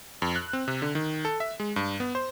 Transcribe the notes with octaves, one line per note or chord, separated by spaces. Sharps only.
F2
F#6
C4
C3
D3
D#3
A4
E5
G#3
G2
B3
C5